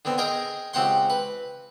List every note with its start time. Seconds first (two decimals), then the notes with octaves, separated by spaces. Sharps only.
0.05 D3 B3 C4
0.18 G#4 A#4 D#5 G5
0.74 C#2 C4 G4 F#5 C6
1.10 B4